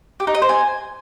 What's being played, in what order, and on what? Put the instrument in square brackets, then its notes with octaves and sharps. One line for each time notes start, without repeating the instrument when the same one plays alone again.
[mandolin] G4
D#4
D#5
C5
G#5